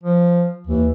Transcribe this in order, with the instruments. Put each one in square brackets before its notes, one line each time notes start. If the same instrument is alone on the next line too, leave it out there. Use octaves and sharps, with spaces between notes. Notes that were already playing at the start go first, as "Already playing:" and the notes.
[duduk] F3
[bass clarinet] D#2 [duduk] E3